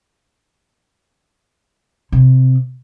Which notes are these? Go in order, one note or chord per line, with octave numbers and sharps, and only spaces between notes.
C3